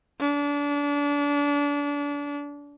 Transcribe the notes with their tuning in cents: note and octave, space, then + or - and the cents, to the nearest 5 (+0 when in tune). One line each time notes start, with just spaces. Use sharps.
D4 -30